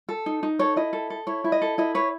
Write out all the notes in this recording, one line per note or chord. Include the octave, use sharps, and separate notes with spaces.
A4
D#4
D#4
A4 C#5
E4 D#5
A4
A4
E4 C#5
E4
D#5
A4
E4 D#5
B4 C#5